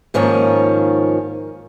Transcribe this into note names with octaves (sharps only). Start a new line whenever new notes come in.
G#2 D#3 F3 A#3 C#4